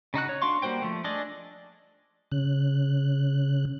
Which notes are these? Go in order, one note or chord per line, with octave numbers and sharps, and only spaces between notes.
C#3 D#4 F#4 F#6
C#5
D4 F#4 F5 C6 C#6
G3 A#3 F#4 C5 G5
F3 A3
D4 G#4 A4 D5 D#5
C#3 F#6